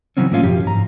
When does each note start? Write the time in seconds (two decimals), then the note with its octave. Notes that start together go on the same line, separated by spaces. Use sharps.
0.17 C#3 E3 F#3 C4 C#4
0.32 A2 F3 A#3 C#4 F4
0.43 B1 F#2 F3 G4
0.65 G#2 A#5